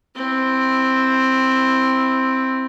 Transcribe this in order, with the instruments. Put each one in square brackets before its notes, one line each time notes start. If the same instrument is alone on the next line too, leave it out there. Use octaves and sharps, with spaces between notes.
[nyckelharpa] C4 E4